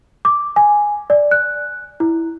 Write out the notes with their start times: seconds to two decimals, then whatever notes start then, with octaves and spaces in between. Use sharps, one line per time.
0.25 D6
0.56 G#5
1.10 D5
1.31 F#6
2.00 E4